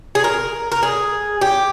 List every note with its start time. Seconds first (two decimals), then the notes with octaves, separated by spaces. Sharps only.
0.15 G#4
0.24 A#4
0.72 A#4
0.83 G#4
1.41 G4